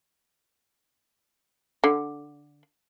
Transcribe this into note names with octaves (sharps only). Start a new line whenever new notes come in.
D3